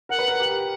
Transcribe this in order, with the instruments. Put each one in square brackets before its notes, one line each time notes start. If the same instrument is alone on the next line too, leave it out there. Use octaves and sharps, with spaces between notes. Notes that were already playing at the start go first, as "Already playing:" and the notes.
[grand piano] A#4 [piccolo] F#5
[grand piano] B4
A#4
G4